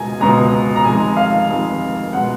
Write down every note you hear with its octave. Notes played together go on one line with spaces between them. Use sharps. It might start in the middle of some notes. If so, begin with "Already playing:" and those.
Already playing: C#2 B2 G#3 G#5 A#5
C#2 B2 G#3 A#5
A#5
F1 F2 D#3 G#3 G#5
F5
F1 F2 D#3 G#3
B2 G#3 F#5